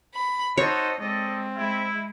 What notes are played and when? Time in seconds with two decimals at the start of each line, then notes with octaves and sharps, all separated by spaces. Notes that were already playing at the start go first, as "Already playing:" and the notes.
0.14 B5
0.58 D#4 F#4 A4 C5 C#5 D#5
1.00 G#3 C4 A4 D5 D#5
1.57 G#3 E4